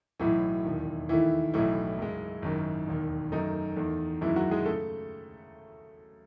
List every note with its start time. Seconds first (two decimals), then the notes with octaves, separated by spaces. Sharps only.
0.19 B1 A2 E3 F#3 A3 E4
0.64 E1 D#2 D#3
1.09 D#2 D#3 E3 A3 E4
1.54 B1 A2 E3 F#3 A3 E4
1.98 F#2 C#3 G#3
2.42 G#1 F#2 D#3
2.88 E1 D#2 D#3
3.32 F#2 D#3 A3 D#4
3.77 E2 D#3 A3
4.21 F#2 D#3 E3 G#3 E4
4.36 F#3 F#4
4.51 G#3 G#4
4.66 C#3 A3 A4